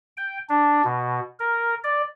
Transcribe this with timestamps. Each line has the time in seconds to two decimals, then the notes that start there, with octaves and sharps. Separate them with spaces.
0.17 G5
0.49 D4
0.84 B2
1.40 A#4
1.84 D5